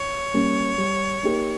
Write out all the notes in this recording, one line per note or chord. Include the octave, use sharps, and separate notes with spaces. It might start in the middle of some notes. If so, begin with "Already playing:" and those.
Already playing: C#5
G3 A#3 C#4
G3
A#3 D#4 G4 A#4